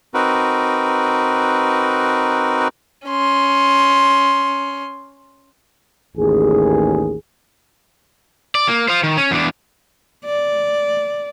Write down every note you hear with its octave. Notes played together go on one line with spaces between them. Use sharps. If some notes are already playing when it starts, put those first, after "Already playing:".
C4 D#4 F#4 A#4 B4
C#4 C6
A1 D#2 G#4
D5
A#3
C5 F5
D#3
C#4
E2 D4
D5